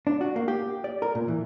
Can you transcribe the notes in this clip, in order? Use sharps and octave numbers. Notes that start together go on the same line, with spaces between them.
D4
F#4
A#3
G4
D5
A#4
A#2
E3